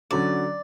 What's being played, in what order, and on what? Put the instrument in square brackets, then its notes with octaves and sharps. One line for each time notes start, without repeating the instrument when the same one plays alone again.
[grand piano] D3 F#3 C#4 [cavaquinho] D5